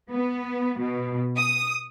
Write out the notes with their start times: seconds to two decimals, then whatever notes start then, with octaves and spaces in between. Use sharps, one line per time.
0.10 B3
0.79 B2
1.37 D#6